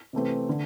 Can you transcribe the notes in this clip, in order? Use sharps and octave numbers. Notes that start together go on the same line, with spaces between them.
C3 E3 A3 C4
D3